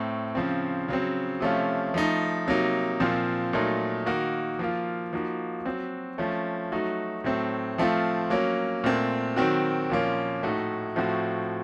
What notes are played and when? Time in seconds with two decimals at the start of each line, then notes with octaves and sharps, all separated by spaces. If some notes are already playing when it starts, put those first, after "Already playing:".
Already playing: A2 A3 C4
0.35 C#3 F3 C4
0.88 C#3 F#3 C4
1.41 C3 F3 A3 C#4 F4
1.94 F3 A3 D#4
2.48 C3 F#3 A#3 D#4
3.00 A#2 F3 C4 F4
3.53 A#2 F#3 A3 D#4
4.06 D#3 A#3 D#4 F#4
4.59 F3 A#3 F4
5.13 F3 A#3 D#4 F#4
5.65 F#3 C4 F#4
6.18 F3 A3 C#4
6.72 F#3 A3 D#4 F#4
7.24 A2 F#3 A3 C4
7.78 F3 A3 C4 F4
8.30 F#3 A#3 C#4
8.84 A#2 A3 C4
9.36 D#3 F#3 C4 F#4
9.90 A#2 F3 A#3 C#4
10.43 A2 A3 D#4 F#4
10.96 A2 F3 A3 C4 F#4